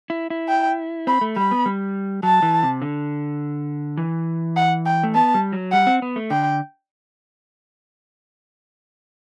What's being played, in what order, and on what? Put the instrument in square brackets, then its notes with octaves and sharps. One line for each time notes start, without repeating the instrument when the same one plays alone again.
[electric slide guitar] E4
E4
[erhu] G5
[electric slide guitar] C4 [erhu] B5
[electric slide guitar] A3
[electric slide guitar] G3 [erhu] B5
[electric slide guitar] B3
G3
[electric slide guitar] F#3 [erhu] A5
[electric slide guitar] E3
C3
D3
E3
[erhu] F#5
G5
[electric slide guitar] A3
[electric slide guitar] B3 [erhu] A5
[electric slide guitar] G3
F#3
[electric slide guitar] G3 [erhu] F#5
[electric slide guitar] C4
B3
A3
[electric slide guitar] D3 [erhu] G5